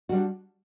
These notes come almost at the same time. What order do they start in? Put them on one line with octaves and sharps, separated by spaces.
F#4 G3 D4